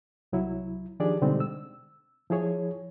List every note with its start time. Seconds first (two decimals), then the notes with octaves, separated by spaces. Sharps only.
0.33 C2 F#3 E4
1.00 D#3 F3 D4 G4 G#4 D5
1.21 B2 D3 G3 G#3 C4 D#4
1.40 E6
2.30 F3 E4 G#4 C#5